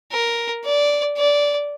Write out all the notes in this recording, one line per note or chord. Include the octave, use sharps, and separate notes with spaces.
A#4
D5
D5